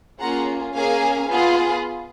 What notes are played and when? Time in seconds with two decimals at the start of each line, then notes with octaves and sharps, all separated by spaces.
0.20 A#3 C#4 F4 G#4 F#5 A#5
0.74 A#3 C#4 G#4 F5 G#5
1.29 B3 F4 G#4